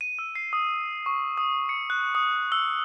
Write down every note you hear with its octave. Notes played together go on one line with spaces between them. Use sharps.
D#7
E6
C7
D#6
C#6
D#6
C#7
F#6
D#6
E6